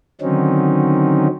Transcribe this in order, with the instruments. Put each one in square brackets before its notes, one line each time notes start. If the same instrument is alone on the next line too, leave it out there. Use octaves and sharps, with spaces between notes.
[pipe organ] D3 D#3 F#3 C4 C#4 D#4